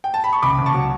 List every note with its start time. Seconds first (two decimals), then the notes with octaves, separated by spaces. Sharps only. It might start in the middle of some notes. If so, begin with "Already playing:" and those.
0.04 G5
0.14 A5
0.24 B5
0.33 C#6
0.43 C#2 B5 D6
0.58 C#2
0.66 A5 C#6
0.74 F#3